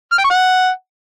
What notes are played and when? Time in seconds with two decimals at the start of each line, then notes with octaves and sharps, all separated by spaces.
0.12 F6
0.18 G5
0.24 C#6
0.30 F#5